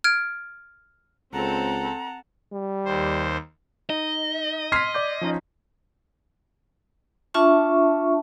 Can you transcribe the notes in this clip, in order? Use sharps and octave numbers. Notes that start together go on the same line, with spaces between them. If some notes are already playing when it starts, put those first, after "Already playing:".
F6 G#6 D7
C#2 C4 A4 F#5 A5 A#5
G3
D#2 C5
D#4 D#5
C6 F6 G#6 B6 C7
D5 D6 G6
F3 C#4 D#4
D4 F4 E5 A5 C#6